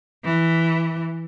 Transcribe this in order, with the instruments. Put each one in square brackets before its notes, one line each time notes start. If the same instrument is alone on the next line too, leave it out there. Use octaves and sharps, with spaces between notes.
[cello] E3